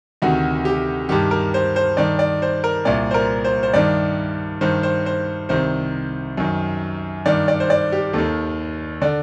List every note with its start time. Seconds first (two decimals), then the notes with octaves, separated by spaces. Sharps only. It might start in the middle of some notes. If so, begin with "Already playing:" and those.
0.22 D2 C3 D#3 F#4
0.65 G4
1.09 G2 D#3 G4
1.31 A#4
1.54 C5
1.76 C5
1.97 G2 D#3 D5
2.19 D5
2.42 C5
2.64 A#4
2.85 C2 A#2 D5
3.11 C5
3.14 A#4
3.45 C5
3.63 C5
3.73 G2 D#3 D5
4.61 G2 D#3 C5
4.83 C5
5.06 C5
5.49 C2 C3 D#3 C5
6.38 F#2 D#3
7.26 G2 D#3 D5
7.48 D5
7.60 C5
7.70 D5
7.92 G4
8.13 D#2 D#3 A4
9.02 D3 D5